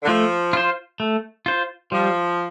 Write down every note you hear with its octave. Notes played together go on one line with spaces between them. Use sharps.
D3
F3 A3
F4 C5
A3
F4 C5
F3 G3